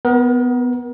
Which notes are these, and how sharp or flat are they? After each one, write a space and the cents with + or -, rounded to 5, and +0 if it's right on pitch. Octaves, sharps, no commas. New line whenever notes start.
B3 +10 A#4 +40